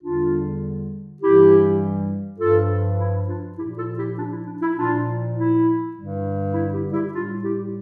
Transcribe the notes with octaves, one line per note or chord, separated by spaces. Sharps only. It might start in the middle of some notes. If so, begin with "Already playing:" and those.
E2 D3 G3 D4 F4
G2 E3 G3 E4 G4
G2 F3 F4 A4
E4
D4 F4
A#2 F3 E4 G4
F4 A4
E4 G4
D4 F4
E4
D4
E4
E4
A#2 F3 D4 F4
E4
G2 D3 G3
E4
E4 G4
E4 G4
A2 G3 D4 F4
E4 G4